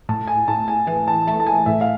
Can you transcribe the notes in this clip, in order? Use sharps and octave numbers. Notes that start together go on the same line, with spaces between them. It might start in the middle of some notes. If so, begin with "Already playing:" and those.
A2 A5
G#5
A2 A5
G#5
E3 G#5
A5
A3 A5
A5
G#5
A2 E5
F5